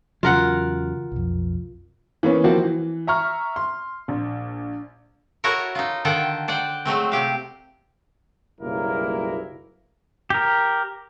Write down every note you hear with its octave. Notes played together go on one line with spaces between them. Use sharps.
E2 C#3 F#3 F4 A#4 F#5
B1 F2
E3 A#3 B3 C#4
F3 A#3 C4 E4 F#4
E3
E5 A#5 C#6 F6
C6
A#1
E4 F#4 A4 A#4 C#5 F#5
D#4 F4
D3 D#3 F4 A4 F#5 G5
C5 D5 F#5 G5
F#3 G#3 A3 C4
C3 G4 F5
F#1 B1 G3 A#3 E4 A#4
G4 A#4